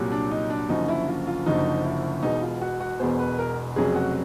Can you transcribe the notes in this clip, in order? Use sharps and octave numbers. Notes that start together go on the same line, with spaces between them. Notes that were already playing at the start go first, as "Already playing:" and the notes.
Already playing: C2 A#2 F#3
D4
D#4
D4
F#1 F#2 D3 F3 D#4
E4
F4
F4
F#1 F#2 D3 F3 D#4
E4
E1 E2 B2 D#4
F4
F#4
F#4
E1 E2 B2 C5
B4
A#4
F1 F2 C#3 F#3 G#4
F#4